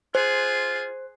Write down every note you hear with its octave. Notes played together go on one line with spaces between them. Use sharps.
F4 G#4 C5